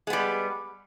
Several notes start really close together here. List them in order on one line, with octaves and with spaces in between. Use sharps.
G#3 B3 G3